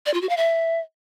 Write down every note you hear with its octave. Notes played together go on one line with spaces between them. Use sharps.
D5
F4
F#4
F5
E5